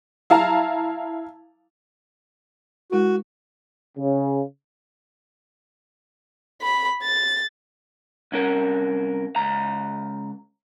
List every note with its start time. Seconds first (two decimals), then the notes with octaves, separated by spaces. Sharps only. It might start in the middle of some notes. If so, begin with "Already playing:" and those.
0.30 E4 F5 A5 A#5
2.92 G#3 E4 F#4 A#4
3.98 C#3
6.62 B5
7.03 A6
8.32 C2 C#4 A#4
9.36 C#2 A#5